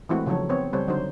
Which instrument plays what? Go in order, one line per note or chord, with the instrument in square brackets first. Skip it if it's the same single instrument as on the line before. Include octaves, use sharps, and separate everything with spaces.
[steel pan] E3 G#3 A3 C4 E4 F#4
C#3 F3 F#3 D#4 A4 C#5
B3 C4 C#5
C#3 G3 C4 A4 C5 C#5
D3 F#3 D#4 F#4 C5